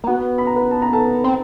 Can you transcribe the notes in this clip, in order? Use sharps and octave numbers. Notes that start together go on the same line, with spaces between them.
A#3
B3 F#4 F#5
B5
A#5
B4 B5
A5
A#5
A4 A5
C4